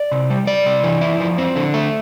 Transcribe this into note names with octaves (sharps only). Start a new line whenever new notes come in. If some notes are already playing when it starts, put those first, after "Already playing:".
Already playing: D5
C3
G3
G3 D5
C3
E3
E4
F3
C4
D3
A3